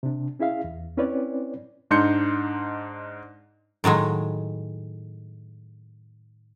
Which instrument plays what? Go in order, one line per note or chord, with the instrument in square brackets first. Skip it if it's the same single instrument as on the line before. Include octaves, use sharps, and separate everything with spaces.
[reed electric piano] C3 D4
C#4 E4 G#4 E5 F5
E2
C4 C#4 E4 B4 C#5 D5
[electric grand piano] G#2 D4 D#4 C6 G6 C#7
[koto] A2 D#3 F#3 G#3